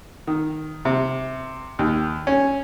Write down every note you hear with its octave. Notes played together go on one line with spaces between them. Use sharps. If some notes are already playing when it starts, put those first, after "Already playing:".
D#3
C3
D#2
C#4